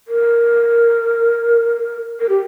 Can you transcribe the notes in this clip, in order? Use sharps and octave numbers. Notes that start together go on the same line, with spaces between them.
A#4
A#4
G4